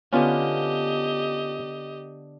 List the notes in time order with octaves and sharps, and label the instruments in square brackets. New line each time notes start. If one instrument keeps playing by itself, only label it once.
[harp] D3 B3 [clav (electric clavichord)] C#4 F4 B4 [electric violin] G4 D#5